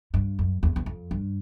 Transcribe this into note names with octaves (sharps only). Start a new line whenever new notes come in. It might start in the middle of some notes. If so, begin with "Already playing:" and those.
G2
F#2
E2
E2
F2
G2